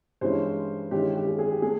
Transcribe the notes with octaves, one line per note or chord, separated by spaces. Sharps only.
G2 E3 G#3 C#4 E4 C5
G2 D#3 G#3 C#4 E4 G4
G4
G#4
G#4
G4
A3 G#4